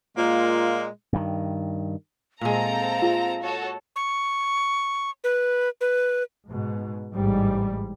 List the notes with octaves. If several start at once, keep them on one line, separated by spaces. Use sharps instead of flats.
A#2 G#3 A#3 F4
G2 D#3
A#2 G#3 C4 A4 F5 A#5
F4 G#4
F#4 A4 C#5
C#6
B4
B4
G#2 B2
A1 G#2 G3